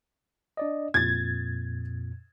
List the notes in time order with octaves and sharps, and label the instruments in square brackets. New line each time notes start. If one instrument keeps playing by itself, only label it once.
[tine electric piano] D4 D5 D#5
[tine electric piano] F2 A#2 [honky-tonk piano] G#6 A6